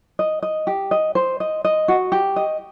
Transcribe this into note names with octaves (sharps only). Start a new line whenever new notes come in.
D#5
D#5
G4
D#5
C5
D#5
D#5
F#4
G4
D#5